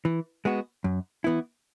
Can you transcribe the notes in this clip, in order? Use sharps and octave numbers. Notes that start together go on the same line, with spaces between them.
E3
G#3 B3 F#4
F#2
E3 B3 E4